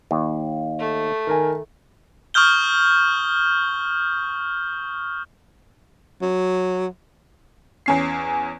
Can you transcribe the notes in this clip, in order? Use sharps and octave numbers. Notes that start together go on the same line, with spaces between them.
D#2
A3
D#3 A#4 G#5
C#6 D#6 F6 G6 G7
F#3
E2 C#4 C7